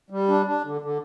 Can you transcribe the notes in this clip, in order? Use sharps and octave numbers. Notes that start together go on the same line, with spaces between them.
G3
D4
D4
D3
D3